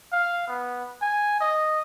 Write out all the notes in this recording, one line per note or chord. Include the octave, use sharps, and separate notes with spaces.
F5
B3
G#5
D#5